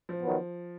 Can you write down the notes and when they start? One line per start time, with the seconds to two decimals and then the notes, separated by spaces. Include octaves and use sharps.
0.09 F3
0.22 D#3 F#3 B3